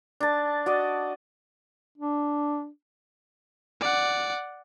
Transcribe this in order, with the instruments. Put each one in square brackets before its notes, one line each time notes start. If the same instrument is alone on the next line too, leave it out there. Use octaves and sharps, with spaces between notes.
[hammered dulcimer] D4 A5
F#4 D5 D#5
[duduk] D4
[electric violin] D5 F#5